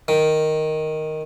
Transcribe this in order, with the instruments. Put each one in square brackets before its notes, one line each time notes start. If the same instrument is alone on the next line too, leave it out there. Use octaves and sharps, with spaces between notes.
[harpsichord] D#3